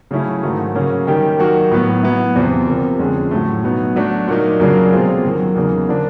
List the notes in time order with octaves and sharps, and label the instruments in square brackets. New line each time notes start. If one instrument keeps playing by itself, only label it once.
[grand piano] C#3 F#3 A3 C#4 E4
G#2 D#3 F#3 A3
C#3 F#3 A#3 C#4
D#3 G3 A#3 D#4 G4
D#3 F#3 A#3 D#4 F#4
A2 F#3 B3
F#3 B3 E4
E2 C3 F3
C3 F3 A#3
F2 D3 F3 G#3 C#4
A2 F#3 A3
B2 F#3 B3 D#4
F#3 A3 D4 F#4
A#2 F#3 A#3 D#4
F#2 C#3 F#3 A#3 D4
B2 G#3 C4 F4 A4
F#2 D#3 F#3 A#3
E2 C#3 F#3 A#3 D#4
D3 F3 A#3 D4